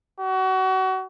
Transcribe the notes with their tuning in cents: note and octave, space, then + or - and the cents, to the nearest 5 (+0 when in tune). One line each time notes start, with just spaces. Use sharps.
F#4 +30